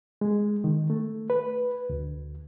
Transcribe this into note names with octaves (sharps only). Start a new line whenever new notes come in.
G#3
D#3
A3
B4
D2